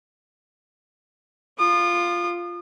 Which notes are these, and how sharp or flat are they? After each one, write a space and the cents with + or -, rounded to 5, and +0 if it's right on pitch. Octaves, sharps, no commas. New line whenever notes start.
F4 +0 D#6 -35